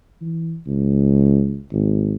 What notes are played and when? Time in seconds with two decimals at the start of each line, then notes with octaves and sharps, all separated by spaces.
0.21 E3
0.67 C#2
1.72 G#1